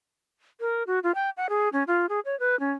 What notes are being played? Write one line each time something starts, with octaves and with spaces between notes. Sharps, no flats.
A#4
F#4
F4
G5
F#5
G#4
C#4
F4
G#4
C#5
B4
C#4